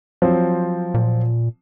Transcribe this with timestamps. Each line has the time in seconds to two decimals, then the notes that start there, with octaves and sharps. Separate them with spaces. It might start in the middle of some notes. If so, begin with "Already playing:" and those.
0.22 F3 F#3 C4
0.94 A#2